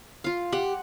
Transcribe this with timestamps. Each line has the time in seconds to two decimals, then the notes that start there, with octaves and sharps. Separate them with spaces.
0.24 F4 F5
0.53 G4 F#5